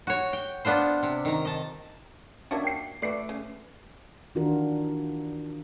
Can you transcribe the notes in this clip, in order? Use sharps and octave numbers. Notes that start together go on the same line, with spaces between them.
F#4 C#5
G5
B3 D4 F4 C5
C3
D#3 A#5
D#5 A5
A#3 C#4 D4 F#4 E5
G5 C7
A3 F#4 B4 D5 C7
C#3
D#3 E3 D4 F4 F#4 A#4